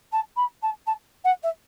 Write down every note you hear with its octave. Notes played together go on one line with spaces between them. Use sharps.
A5
B5
A5
A5
F#5
E5